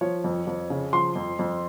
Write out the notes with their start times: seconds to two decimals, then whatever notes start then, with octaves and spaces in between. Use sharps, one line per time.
0.01 F3 C#5
0.24 F2
0.47 F2
0.70 C#3
0.93 F3 C6
1.16 F2
1.39 F2